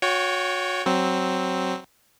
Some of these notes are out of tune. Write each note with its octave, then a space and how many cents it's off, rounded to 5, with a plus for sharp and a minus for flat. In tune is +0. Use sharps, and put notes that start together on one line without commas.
F#4 -30 C#5 +10 G5 +0
F#3 +15 C4 +5